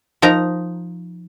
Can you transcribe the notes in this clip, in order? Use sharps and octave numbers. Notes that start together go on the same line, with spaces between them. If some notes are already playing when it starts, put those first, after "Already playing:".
F3 D#4 A#4 A#5